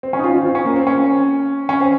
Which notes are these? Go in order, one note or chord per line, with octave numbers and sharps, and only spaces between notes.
C4
C#4
D#4
F4
F4
C4
C#4
A#3
C4
C#4
C#4
C4